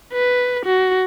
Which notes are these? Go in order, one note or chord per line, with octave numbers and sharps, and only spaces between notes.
B4
F#4